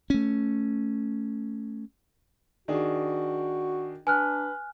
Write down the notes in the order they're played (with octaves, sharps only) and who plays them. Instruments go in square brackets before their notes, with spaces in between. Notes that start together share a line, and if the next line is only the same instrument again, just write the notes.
[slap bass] A3 C#4
[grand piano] D#3 D4 G#4 [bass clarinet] F#4
[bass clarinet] D4 [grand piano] B4 [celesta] G#5 F6 F#6